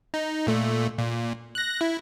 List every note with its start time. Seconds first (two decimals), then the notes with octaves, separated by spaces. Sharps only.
0.14 D#4
0.47 A#2 A3
0.98 A#2
1.55 F#6 A#6
1.81 E4